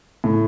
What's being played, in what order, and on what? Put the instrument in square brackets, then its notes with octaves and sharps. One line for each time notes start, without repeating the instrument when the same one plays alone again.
[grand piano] A2